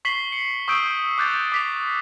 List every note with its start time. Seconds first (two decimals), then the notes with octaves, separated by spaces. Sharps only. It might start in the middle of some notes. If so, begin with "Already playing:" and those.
0.05 C#6 B6 C7 F#7 G7
0.32 C#7
0.68 C#6 D#6 E6 G6 D7
1.18 D6 F#6 G6 A6
1.52 D6 B6 F7